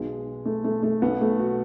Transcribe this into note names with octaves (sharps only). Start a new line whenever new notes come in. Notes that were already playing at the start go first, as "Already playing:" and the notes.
Already playing: B1 B2 G#3
A3
A3
A3
B1 B2 B3
A3
F#4